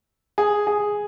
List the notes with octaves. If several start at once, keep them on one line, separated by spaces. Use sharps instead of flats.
G#4
G#4